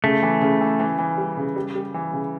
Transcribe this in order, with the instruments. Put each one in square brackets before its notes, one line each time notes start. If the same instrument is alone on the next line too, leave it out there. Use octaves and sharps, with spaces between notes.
[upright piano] C#3 [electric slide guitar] A3
[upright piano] E3
C#3
E3
E3
E3
G3
C#3
G3
G3
E3
C#3